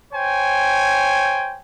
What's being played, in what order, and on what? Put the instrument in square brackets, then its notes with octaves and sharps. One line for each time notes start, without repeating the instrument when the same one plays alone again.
[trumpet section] C5 C#5 G5 G#5